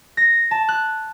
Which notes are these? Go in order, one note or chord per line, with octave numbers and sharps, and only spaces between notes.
A#6
A5
F#6